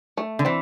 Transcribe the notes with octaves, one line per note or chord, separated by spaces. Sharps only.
A3
D3
E3 C4